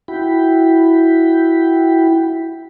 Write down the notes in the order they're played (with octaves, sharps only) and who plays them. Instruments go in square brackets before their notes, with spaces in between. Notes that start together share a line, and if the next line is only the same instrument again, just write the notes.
[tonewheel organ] E4 F#4 G5 B5